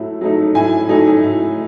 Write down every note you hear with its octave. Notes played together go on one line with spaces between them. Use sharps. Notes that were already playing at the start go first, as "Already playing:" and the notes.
Already playing: A2 F#3 A3
F#3 A3 D#4
A2 G#5
F#3 A3 D#4
A2